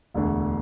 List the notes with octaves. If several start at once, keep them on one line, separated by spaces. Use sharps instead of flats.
E1 D2 D3